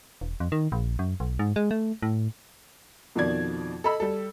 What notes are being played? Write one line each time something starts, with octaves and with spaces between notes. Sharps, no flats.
E1
F2
D#3
A#1
F#2
B1
G#2
G#3
A3
A2
F2 B2 D#3 F3 D5 G#6
A4 D#5 B5 E6
G3 A4